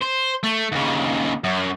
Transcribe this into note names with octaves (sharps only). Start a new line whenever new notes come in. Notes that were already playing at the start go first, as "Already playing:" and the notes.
C5
A3
D#2 C#3
F#2